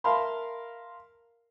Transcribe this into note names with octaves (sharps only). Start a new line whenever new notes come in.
A#4 E5 F5 A5 B5 C6